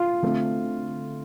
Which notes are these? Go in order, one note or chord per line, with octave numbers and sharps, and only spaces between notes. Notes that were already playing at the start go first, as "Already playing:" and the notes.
Already playing: F4
D3 A3 C4